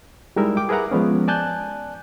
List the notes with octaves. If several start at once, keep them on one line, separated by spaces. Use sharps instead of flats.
G3 G#3 D#4 E4 A#4 E5
G5 D6
G#4 A#4 B4 E5 F#5 A#5
F3 G#3 B3 C#4
D5 G#5 A5 F#6 G6